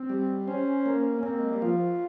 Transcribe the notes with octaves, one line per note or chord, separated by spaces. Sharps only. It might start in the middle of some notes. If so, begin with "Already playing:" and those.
Already playing: C4
G3
C#4 C5
A#3
C#4
A#3 C4
G#3
G3
F3 F4